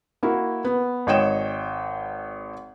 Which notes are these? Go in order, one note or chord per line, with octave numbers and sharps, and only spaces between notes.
A#3 E4 F#4
B3
G#1 C#5 D#5 G5 E7